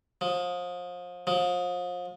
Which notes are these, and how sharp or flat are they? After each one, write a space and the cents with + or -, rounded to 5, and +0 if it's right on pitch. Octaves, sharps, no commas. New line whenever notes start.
F3 +30
F3 +35